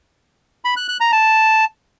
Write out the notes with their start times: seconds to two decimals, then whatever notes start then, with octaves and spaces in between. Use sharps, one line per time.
0.65 B5
0.76 F#6
0.88 F#6
1.00 A#5
1.12 A5